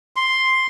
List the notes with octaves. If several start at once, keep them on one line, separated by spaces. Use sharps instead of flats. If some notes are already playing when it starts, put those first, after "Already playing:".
C6